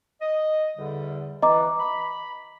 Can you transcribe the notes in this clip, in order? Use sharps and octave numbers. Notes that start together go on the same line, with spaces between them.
D#5
E2 D3 G3
E3 D#5 A#5 D6
B5